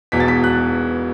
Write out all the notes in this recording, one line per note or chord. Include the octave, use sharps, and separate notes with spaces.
E1 E2 B2 B6
A6
B6
F#6